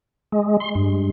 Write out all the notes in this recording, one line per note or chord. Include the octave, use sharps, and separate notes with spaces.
G#3
C6
G2